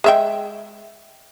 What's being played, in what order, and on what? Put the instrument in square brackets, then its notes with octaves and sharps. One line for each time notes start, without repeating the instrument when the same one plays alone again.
[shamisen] G#3 E5 G5